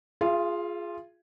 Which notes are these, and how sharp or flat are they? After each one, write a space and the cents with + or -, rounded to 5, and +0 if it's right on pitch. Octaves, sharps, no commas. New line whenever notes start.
F4 +0 G#4 +0 F5 -40